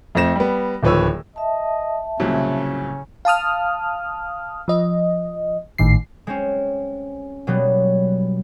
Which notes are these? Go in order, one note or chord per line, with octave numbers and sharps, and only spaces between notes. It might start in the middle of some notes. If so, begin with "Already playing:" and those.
F2 A3 C4 A#6 E7
G3 B3
D1 D#2 F3 B4 C#5 E6
D#5 E5 A5
C2 A#2 C#3 F#3 C#4
F5 A5 D#6 F6
F3 D#5
G#1 A2 D#3 C7
G#3 C4 C#4
B2 F#3 G3 A#3 B3